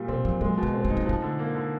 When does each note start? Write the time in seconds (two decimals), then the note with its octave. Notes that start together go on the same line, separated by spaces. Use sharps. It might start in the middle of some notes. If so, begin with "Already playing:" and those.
Already playing: A#2 G3
0.08 C3 C4
0.24 A#2 F3
0.41 F#3 G#3
0.58 B2
0.63 A#3
0.74 C4
0.85 A3
0.90 D#4
0.97 A#3
1.06 F3 A3
1.22 D3
1.39 A#3
1.55 D3